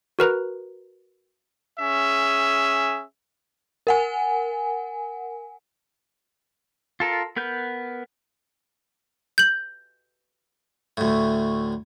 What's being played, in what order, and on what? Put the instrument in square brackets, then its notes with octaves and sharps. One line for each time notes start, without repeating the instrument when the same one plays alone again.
[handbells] F#4 A#4 B4 A#5
[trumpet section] C#4 G#4 E5
[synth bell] A#4 F#5 G#5
[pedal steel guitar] F4 A4 A#4
B3 A#4 B4 G6
[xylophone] G6 F#7
[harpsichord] D2 A2